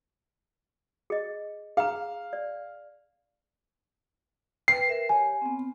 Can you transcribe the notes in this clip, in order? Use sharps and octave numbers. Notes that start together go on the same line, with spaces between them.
G#4 D#5
G#4 F5 A#5
D5
B4 G5 C7
A#4 E5
G4 C#5 G#5
B3 C4